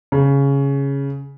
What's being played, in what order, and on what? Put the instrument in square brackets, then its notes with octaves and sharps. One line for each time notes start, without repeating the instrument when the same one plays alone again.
[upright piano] C#3